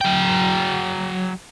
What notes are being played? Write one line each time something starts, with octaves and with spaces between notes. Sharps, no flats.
F#3 G5